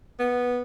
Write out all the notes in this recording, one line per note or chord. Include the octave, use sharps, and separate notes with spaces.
B3